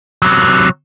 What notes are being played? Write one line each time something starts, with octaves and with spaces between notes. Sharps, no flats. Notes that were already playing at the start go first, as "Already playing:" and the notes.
C3 F#3